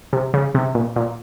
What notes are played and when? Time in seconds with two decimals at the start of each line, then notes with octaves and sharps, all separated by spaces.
0.13 C3
0.34 C#3
0.55 C3
0.75 A#2
0.96 A#2